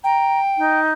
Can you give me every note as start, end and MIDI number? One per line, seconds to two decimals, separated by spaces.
0.04 0.80 79
0.04 0.40 82
0.58 0.93 63